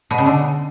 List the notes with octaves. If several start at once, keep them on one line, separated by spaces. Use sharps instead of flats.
B2
C#3
D3